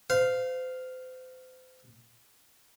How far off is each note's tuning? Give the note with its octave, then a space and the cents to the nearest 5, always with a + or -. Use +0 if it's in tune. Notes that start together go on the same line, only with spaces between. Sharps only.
C5 -35 F5 +0